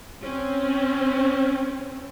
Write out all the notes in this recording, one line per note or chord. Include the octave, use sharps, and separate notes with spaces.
C4 C#4